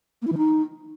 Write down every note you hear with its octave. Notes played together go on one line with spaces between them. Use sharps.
A#3
E4
E3
D#4